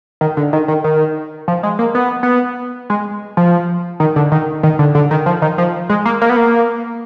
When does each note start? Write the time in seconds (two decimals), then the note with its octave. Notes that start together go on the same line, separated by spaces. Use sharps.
0.21 D#3
0.37 D3
0.53 D#3
0.68 D#3
0.84 D#3
1.48 F3
1.63 G#3
1.79 A#3
1.95 B3
2.23 B3
2.90 G#3
3.37 F3
4.00 D#3
4.16 D3
4.32 D#3
4.63 D#3
4.79 D3
4.95 D3
5.11 D#3
5.26 F3
5.42 D#3
5.58 F3
5.90 G#3
6.05 A#3
6.22 A#3
6.30 B3
6.37 A#3